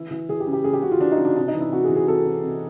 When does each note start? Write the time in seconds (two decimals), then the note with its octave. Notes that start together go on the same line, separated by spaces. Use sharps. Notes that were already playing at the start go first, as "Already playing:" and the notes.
Already playing: E3 E4
0.11 E3
0.29 E3 G#4
0.40 G4
0.47 C#3
0.53 G4
0.64 C#3 G#4
0.73 G4
0.82 C#3 F#4
0.92 F4
1.00 E3 D4
1.12 D#4
1.18 C#3
1.25 D4
1.36 C3 D4
1.48 D#4
1.55 E3
1.60 E4
1.71 C3 F#4
1.84 G#4
1.89 E3
1.96 G#4
2.08 C3 A4
2.25 C3
2.43 C3